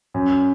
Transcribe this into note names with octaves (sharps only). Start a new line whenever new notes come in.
F#2